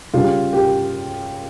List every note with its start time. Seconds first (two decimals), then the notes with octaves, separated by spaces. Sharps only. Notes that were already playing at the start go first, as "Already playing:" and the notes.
0.14 C#3 G3 F4
0.53 G4